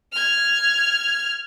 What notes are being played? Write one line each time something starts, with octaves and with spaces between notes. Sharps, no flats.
F6 G#6